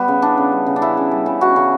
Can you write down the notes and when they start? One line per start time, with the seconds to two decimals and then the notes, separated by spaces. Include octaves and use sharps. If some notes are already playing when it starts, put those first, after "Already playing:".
Already playing: G3 B3
0.08 C#3
0.22 E3 D4
0.38 C#3
0.52 G3
0.66 C#3
0.76 D4
0.82 E3 E4
0.97 C#3
1.11 G3
1.26 C#3
1.41 E3 F#4
1.56 C#3